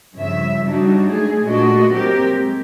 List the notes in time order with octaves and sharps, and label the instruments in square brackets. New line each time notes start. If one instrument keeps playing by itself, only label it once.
[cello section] G2 C#3 F3 E5
F#3 G3 D4 D#4 F#4
G#3 A3 G#4
A#2 A3 D4 F#4 D#5
F#3 C4 G4 A#4
G#3